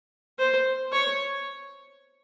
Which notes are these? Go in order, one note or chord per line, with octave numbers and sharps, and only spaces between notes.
C5
C#5